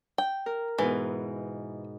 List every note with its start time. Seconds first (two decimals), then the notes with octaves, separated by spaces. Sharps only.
0.18 G5
0.46 A#4
0.79 G#2 B2 E3